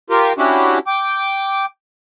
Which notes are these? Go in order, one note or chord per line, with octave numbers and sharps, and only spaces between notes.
F4 G4 A#4
C#4 D4 E4 F#4 G4
G5 D6